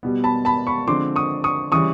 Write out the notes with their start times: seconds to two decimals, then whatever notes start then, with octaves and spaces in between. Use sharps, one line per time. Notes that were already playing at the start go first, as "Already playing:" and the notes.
0.03 B2 G3 B3
0.24 A5 B5
0.45 A5 B5
0.67 B5 C#6
0.87 D3 F3 G#3 C4 C6 D6
1.16 C#6 D#6
1.44 C#6 D#6
1.72 C#3 E3 G3 C#6 D#6